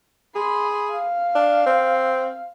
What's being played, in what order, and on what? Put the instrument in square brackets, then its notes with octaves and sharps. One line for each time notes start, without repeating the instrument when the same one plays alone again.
[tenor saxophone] G#4 [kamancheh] B5 C6
[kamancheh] F5
[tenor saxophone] D4
C4